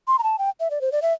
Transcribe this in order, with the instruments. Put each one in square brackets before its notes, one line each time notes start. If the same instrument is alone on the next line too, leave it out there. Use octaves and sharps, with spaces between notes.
[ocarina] C6
A#5
A5
G5
E5
D5
C5
D5
E5